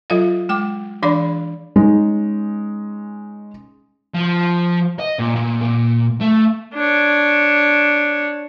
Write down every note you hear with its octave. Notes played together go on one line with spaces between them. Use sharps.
F#3 F4 A4 D#5 F5
G#3 G5 D6
E3 D4 G#4 D5 F5 B5
G#3 C#4 D#4
F3
D#5
A#2
A#2
A#2
A3
D4 C#5